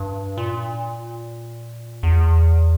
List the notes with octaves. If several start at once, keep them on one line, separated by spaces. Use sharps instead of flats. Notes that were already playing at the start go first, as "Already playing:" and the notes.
Already playing: G2
A#2
E2